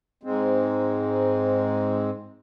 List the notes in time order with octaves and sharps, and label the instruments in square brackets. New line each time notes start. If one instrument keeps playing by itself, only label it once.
[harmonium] G#2 G#3 C4